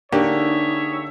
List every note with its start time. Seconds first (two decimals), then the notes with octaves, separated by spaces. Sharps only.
0.12 D3 A#3 D#4 G4 G#4 C#5 E5